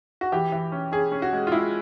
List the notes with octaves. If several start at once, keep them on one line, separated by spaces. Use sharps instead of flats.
F#4
E3 G4
E3
C#4
C#4 G#4
C#4
F#4
G#3
F4
G#3 E4